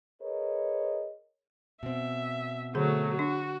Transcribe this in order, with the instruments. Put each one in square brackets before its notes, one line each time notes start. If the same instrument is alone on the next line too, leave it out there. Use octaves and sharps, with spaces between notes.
[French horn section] G#4 A#4 B4 C#5 D#5
[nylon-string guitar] B2 C4 [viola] E5
[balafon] D3 G#4 [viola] F#3 A3
[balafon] D4 [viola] F#4